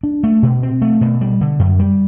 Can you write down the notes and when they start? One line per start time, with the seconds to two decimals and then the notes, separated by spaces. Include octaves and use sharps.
0.03 D4
0.24 A3
0.43 B2
0.63 C4
0.82 A3
1.01 B2
1.21 G3
1.41 D3
1.59 F#2
1.79 G3